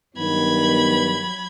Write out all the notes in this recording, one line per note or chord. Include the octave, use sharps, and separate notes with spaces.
G2 D#3 F#3 B3 B5 G#6